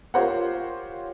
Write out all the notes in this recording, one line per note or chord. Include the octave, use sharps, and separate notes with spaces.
F4 G4 A#4 C5 C#5 F#5